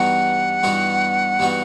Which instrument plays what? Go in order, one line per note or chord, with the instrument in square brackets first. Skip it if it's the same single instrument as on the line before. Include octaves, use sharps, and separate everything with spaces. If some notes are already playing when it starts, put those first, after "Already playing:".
Already playing: [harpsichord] G2 E3 B3 D#4 F#4 [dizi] F#5
[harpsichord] G2 E3 B3 D#4 F#4
G2 E3 B3 D#4 F#4